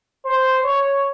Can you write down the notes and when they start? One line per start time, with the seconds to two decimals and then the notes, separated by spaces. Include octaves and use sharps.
0.25 C5
0.63 C#5